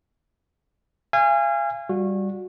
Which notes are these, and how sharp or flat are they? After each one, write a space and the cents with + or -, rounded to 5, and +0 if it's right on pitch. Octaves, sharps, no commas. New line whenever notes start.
F5 -35 G#5 -25
G3 +0 F#4 -25